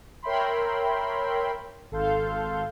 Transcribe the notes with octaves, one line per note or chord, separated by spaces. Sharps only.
A#4 C#5 E5 G5 B5 C6
G#1 A4 F5 C6 G6